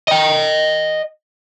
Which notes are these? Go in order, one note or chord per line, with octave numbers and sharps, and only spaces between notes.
D#5 G5